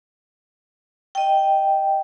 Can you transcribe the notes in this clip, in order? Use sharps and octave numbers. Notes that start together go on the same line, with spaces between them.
D#5 G5